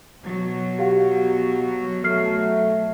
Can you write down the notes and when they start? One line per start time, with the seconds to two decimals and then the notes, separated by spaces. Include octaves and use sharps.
0.22 B2 F#3
0.79 G4 F5 F#5
2.04 A3 F6 C7